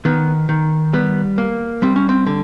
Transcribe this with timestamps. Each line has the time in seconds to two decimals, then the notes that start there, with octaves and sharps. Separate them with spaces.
0.05 D#3 B3
0.49 D#3
0.93 G3 B3
1.38 A#3
1.82 G3 C4
1.96 C#4
2.09 C4
2.26 D3